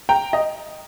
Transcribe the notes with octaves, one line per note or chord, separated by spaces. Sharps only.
G5 A#5
D#5